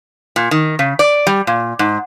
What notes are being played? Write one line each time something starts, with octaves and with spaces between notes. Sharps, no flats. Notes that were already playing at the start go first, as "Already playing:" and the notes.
A#2
D#3
C#3
D5
G3
A#2
G#2